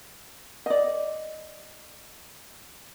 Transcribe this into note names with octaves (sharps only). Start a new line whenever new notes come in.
D5 D#5